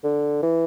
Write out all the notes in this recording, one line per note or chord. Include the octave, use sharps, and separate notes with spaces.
D3
E3